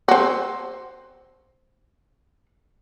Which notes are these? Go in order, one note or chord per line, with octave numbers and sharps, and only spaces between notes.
C4 F#4